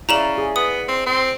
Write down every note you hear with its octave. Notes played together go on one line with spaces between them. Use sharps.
C#3 E4 D5 E5 A#5 E7 F#7
G#4
B3 D#6
C4
C4